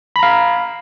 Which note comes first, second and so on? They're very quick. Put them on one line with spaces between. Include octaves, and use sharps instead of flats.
B5 A#5 F5